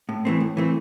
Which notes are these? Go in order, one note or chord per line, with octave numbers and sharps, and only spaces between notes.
A2
E3 A3 C4
A2
E3 A3 C4